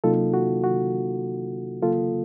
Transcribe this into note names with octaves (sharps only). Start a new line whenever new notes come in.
C3 F#3 A#3 D#4 F4 A4
F#4
F#4
C#3 F#3 A#3 F4 A4